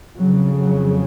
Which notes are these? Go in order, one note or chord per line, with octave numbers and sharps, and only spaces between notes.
F2 C#3 F#3
F#3